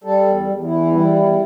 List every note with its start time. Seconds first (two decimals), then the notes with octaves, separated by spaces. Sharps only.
0.04 G3 A4
0.27 E2
0.48 E2
0.64 E4
0.71 E3
0.93 G3 E4
1.15 E2